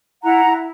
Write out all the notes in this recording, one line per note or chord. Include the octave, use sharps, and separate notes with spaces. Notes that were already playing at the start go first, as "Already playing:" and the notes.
E4 F#5 A#5
E4